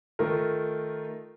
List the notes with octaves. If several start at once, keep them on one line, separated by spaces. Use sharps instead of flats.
D#3 A3 F4 A#4